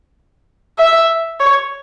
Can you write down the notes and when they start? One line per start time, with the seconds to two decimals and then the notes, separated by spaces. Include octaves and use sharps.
0.78 E5
1.40 C#5